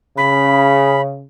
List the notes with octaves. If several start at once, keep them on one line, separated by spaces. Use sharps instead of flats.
C#3 B5